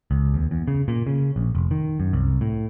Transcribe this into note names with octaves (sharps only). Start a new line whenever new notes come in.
C#2
D#2
E2
C#3
A#2
C#3
A#1
F1
D#3
F#2
C2
A2